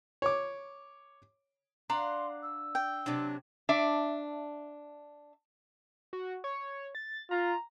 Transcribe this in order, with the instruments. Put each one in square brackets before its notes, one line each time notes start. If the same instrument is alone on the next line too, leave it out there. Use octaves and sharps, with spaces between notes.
[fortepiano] C#5 D6
[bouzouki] D4 F5 F#5 [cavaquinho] A#5 [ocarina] C6
[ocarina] E6
[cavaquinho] G5
[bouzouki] C3 F#3 [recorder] D4
[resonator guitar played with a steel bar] D4 E5
[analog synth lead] F#4
C#5
A6
[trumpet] F4 [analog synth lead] A#5